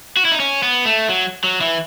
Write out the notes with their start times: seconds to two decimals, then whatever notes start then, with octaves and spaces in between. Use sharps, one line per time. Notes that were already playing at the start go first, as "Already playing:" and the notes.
0.17 F#4
0.25 E4
0.32 D#4
0.40 C#4
0.63 B3
0.85 A3
1.09 F#3
1.44 F#3
1.61 E3